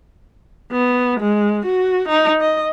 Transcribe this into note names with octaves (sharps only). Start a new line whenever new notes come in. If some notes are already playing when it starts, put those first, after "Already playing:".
B3
G#3
F#4
D#4
D#5